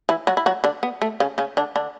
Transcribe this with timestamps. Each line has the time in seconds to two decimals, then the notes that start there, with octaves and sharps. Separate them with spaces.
0.09 E3 E4
0.27 F#3 F#4
0.37 E4
0.46 F#3 F#4
0.64 D3 D4
0.83 B3
1.02 A3
1.20 C#3 C#4
1.38 C#3 C#4
1.57 D3 D4
1.76 D3 D4